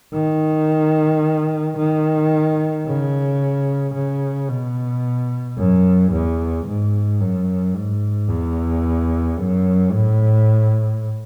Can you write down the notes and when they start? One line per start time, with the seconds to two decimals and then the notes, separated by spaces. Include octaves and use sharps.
0.13 D#3
1.77 D#3
2.86 C#3
3.94 C#3
4.49 B2
5.57 F#2
6.12 E2
6.66 G#2
7.20 F#2
7.75 G#2
8.28 E2
9.38 F#2
9.92 A2